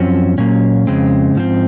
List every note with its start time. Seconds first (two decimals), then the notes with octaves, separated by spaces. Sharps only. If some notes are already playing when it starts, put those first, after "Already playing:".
Already playing: F#2 F3 C4 C#4
0.38 A#2 F#3 A#3 C#4
0.87 F2 C#3 G#3 C4
1.36 G#2 F3 C4